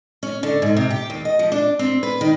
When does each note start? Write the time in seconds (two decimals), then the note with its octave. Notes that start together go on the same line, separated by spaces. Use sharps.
0.23 C#4
0.43 D3
0.62 G#2
0.77 C3
0.90 G4
1.10 D#2
1.25 D#5
1.39 F3
1.52 D4
1.79 C4
2.03 B4
2.21 D#3